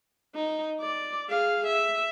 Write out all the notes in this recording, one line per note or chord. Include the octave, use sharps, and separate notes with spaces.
D#4
D5
G#4 F5
E5